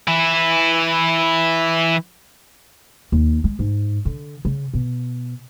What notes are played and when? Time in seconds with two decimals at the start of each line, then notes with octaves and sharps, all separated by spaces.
0.08 E3 E4
3.12 D#2
3.44 G#3
3.59 G#2
4.05 D3
4.45 C#3
4.74 B2